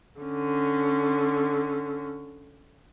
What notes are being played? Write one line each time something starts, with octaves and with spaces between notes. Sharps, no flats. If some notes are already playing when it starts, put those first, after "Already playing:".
D3 C#4